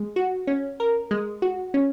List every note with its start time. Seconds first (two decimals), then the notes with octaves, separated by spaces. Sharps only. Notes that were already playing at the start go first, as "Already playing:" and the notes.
Already playing: G#3
0.16 F#4
0.47 C#4
0.80 A#4
1.11 G#3
1.42 F#4
1.74 C#4